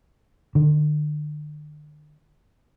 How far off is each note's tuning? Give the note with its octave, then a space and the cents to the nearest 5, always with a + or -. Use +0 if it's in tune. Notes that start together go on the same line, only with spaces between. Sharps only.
D3 +40